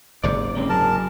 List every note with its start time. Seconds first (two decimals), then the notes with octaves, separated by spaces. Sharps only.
0.24 F#1 G#2 C3 D5
0.57 A#3 C4 C#4
0.69 F#3 G#4 A#4 A5